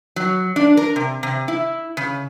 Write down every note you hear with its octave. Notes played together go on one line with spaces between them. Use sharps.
F#3
D4
A#4
C3
C3
E4
C#3